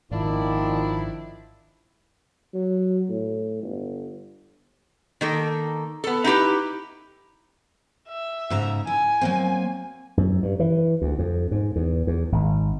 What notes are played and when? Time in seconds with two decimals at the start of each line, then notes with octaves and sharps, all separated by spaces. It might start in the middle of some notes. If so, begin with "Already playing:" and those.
0.11 G#1 A#2 D#3 F3 D4 E4
2.54 F#3
3.09 A2
3.62 G1
5.21 D#3 A#3 A4
6.04 B3 A4
6.24 D#4 E4 G4 B4
8.09 E5
8.50 G#2 C#3 A#5
8.87 E4 G#5
9.21 F#3 A#3 C4
10.17 F#2
10.43 G2
10.60 E3
11.02 D2
11.19 F2
11.51 G#2
11.76 E2
12.07 E2
12.32 G#1